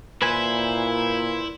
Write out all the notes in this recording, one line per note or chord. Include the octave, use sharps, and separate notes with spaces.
A#2 E4 B4 C5 G#5